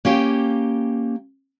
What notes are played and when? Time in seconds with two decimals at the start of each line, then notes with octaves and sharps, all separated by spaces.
0.05 A#3 C#4 G4 G5